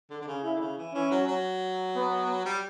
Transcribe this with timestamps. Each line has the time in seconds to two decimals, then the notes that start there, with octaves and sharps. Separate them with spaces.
0.10 D3
0.22 D3
0.28 C#3
0.44 C#3 E4
0.55 D3
0.60 C#3
0.78 E3
0.94 E3 C#4
1.11 F#3
1.28 F#3
1.95 B3
2.46 G3